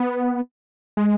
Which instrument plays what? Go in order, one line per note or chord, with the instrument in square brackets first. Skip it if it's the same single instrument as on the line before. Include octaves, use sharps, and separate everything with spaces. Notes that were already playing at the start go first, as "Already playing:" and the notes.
Already playing: [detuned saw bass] B3
G#3